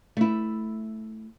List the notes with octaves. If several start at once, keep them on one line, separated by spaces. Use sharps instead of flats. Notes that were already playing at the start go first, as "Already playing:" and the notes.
A3 E4